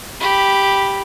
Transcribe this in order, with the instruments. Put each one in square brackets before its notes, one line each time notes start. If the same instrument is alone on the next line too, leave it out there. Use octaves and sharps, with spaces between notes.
[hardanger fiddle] G4 B5